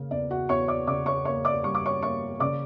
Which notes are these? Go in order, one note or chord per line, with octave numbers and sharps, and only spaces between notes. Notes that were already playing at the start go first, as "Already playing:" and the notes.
Already playing: C#3 A#3
E2 D5
F#4 F#5
E2 C#5 C#6
D5 D6
C#3 D5 D6
C#5 C#6
A#3 C#5 C#6
D5 D6
G3 C#6
D6
C#5 C#6
A#3 C#5 C#6
C#3 D5 D6